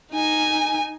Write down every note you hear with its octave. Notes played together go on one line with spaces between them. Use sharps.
D#4 G#5